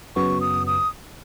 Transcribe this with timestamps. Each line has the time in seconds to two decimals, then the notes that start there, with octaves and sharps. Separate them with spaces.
0.16 F#2 C#3 F#3 B3 C#6
0.41 D#6
0.67 D#6